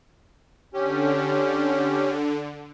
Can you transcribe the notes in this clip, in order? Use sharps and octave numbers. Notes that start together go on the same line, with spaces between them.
D3 C#4 G4